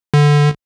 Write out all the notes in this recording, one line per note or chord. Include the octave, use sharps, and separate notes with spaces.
D3